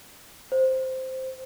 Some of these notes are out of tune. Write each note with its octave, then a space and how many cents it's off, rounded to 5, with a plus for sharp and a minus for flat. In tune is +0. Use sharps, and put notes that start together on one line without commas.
C5 +0